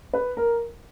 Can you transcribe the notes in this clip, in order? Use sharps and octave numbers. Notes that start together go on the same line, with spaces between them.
B4
A#4